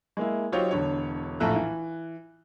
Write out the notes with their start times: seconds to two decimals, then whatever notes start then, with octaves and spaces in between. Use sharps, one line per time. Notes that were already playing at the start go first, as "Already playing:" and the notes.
0.17 G#3 A#3 E4
0.52 F#3 D#4 F4 G4 C5 C#5
0.71 E1 D3 C#5
1.40 A#1 A2 A4 E5 A#5 F#6
1.56 E3